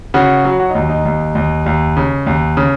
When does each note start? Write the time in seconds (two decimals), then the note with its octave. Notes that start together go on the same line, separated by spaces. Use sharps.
0.14 C#3 F#4
0.45 F#3
0.60 F#4
0.70 D#4
0.75 D#2
0.89 D#4
1.05 D#2
1.35 D#2
1.66 D#2
1.97 C#3
2.27 D#2
2.57 C#3